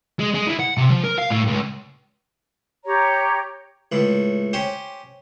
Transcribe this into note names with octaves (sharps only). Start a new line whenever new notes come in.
G#3
G#3
E3
F#5
C3
F3
A#4
F5
A2
C#2
G4 C#5 A#5
C#2 A2
C#4 G4 C5